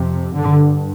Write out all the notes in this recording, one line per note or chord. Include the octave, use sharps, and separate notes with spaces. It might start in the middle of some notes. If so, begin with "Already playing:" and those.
Already playing: F2 C3
G2 D3